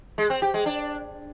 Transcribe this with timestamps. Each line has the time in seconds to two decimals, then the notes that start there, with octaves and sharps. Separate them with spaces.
0.18 G#3
0.30 C4
0.42 G4
0.54 G#3
0.66 D4